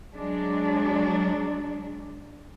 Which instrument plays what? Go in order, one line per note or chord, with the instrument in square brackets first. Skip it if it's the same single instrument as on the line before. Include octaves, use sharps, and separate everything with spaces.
[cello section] F#3 G#3 D4